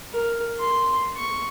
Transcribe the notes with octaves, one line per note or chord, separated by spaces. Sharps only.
A#4
C6
C#6